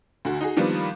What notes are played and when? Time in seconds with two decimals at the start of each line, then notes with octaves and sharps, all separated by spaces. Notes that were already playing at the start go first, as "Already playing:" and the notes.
0.25 D2 F#4
0.41 D#4 F#4 G#4
0.56 D#3 F3 G3 A#3 B3 D4